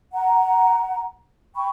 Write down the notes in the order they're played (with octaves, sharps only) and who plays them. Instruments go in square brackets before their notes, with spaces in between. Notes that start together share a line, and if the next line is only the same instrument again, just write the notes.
[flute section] F#5 A#5
G5 B5 C#6